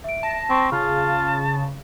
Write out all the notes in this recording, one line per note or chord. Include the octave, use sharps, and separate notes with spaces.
E5 D7
A5 A#6
C4 C#6
C#3 F4 A5